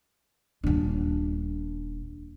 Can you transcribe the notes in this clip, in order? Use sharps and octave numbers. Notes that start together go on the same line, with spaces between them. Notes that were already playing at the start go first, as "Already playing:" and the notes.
D#1 D4